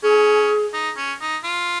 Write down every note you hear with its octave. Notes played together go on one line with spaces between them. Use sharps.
C#4 G#4
D#4
C#4
D#4
F4